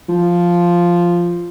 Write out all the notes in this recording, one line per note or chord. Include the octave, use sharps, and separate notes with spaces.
F3